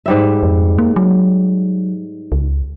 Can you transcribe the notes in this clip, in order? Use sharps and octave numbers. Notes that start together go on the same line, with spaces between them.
G#2 G3 E5
F2
A#3
F#3
C#2